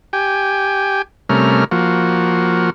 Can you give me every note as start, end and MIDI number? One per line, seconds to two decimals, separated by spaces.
0.13 1.02 67
0.13 1.02 79
0.13 1.02 80
1.29 1.64 48
1.29 1.64 55
1.29 1.64 57
1.29 1.64 61
1.29 1.64 70
1.29 1.64 89
1.71 2.70 53
1.71 2.70 58
1.71 2.70 66